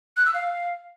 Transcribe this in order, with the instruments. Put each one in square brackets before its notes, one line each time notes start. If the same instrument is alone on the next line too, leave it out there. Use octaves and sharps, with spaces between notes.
[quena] F#6
E6
F5